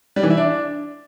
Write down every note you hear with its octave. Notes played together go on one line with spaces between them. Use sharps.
G3
E3
E4
D4